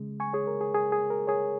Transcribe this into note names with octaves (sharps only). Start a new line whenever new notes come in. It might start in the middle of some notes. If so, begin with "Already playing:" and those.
Already playing: C#3 G#3
G#5 C#6
G#4 C#5
A#4
G#4
G#4
G#4
A#4
G#4 C#5